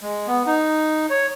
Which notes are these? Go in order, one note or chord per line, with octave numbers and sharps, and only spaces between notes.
G#3
B3
D#4
C#5